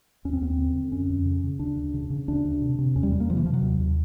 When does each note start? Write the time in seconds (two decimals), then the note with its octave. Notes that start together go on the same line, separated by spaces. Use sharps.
0.25 D#2 C#4
0.33 C4
0.41 D#2 B3
0.50 C4
0.59 D3
0.76 D3
0.92 F2 C#4
1.09 F2
1.25 C#3
1.44 C#3
1.59 D2 D4
1.76 D2
1.94 C#3
2.10 C#3
2.28 D2 D4
2.45 D2
2.62 C3
2.78 C3
2.96 E2 C#4
3.03 G3
3.11 E2 G#3
3.20 A#3
3.29 C3 F3
3.37 E3
3.46 C3 F3
3.54 F#3
3.62 D#2
3.79 D#2